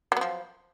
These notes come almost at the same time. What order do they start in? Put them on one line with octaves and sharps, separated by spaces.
F#3 B3 F3